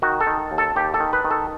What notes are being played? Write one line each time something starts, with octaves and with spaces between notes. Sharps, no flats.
D#3 F#4
A4
D#3
D#2
A4
D#2 G4
A4
D#3
B4
D#3
A4